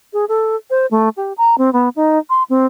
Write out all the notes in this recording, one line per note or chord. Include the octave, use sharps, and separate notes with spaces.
G#4
A4
C5
A3
G4
A#5
C4
B3
D#4
C6
C4